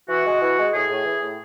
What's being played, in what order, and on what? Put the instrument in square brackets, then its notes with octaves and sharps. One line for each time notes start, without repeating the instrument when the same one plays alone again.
[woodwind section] E3 F#4
G#3
E3
G#3
A2 G#4
A2
E3
A2